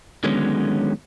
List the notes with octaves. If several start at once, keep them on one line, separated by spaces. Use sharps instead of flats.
D3 D#3 F#3 G#3 B3 C#4